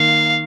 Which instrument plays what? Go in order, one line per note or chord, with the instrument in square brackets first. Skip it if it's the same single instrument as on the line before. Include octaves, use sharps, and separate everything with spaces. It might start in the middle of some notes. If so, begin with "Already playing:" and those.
Already playing: [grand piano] D#3 A#3 [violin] F5